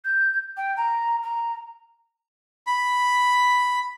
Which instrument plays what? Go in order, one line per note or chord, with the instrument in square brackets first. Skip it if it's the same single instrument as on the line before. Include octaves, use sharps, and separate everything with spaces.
[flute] G6
G5
A#5
A#5
[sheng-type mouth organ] B5